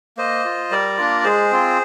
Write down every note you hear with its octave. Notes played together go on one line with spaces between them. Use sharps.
A#3 C5 D#5
F4
G3 A#4 D5
A#3 D4 F4
G#3 G#4 C5
C4 F4